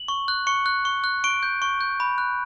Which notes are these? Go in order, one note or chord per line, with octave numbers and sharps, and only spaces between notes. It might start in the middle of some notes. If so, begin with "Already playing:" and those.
Already playing: F#7
C#6
F#6
C#6 C#7
F#6
C#6
F#6
C#6 D7
G6
C#6
G6
B5
F#6